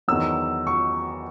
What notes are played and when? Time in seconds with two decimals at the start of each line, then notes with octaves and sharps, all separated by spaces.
0.08 E2 D#3 F#3 E6
0.67 C#6